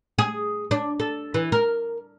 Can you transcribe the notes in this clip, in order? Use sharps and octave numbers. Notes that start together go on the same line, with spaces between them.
G#4
D4
A4
E3
A#4